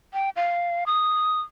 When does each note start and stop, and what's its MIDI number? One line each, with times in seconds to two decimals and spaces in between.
0.14 0.30 79
0.36 0.84 77
0.86 1.41 87